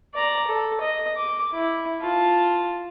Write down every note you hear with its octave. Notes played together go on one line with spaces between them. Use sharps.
D5 A#5
A4
D#5
D6
E4
F4 A5